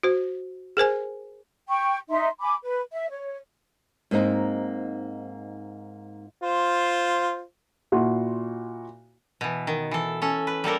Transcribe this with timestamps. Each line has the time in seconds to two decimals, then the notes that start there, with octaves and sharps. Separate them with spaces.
0.03 F#4 C5
0.77 G#4 A#4 C5 G#5
1.69 G5 C#6
2.09 D#4 E5 C6
2.41 G#5 B5 D6
2.62 B4
2.92 E5
3.10 C#5
4.11 G#2 A#3 C4 D#4
6.42 F4 C5
7.92 A#2 E4 F#4 C6
9.41 B2 E3
9.67 D#3
9.91 E3 A4
10.22 C#4 A4
10.47 B4
10.64 G3 A#3 A4 A#4